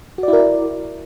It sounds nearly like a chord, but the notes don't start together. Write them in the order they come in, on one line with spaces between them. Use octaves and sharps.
F#4 D5 E4 A#4